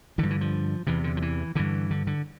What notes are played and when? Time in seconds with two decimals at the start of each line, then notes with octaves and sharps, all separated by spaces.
0.18 G2 D3 E3
0.30 E3
0.41 F3
0.87 E2 C3 E3
1.04 D3
1.17 F3
1.22 E3
1.55 G2 D3 E3
1.91 D3
2.07 D3